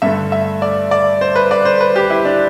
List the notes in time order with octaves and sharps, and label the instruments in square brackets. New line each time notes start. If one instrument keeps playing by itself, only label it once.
[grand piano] G2 D3 A3 E5
E5
D5
D5
C5
B4
D5
C5
B4
G4
E4
D4